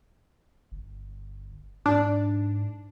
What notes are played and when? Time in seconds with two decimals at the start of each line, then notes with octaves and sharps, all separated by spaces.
0.72 G1
1.86 G#2 D4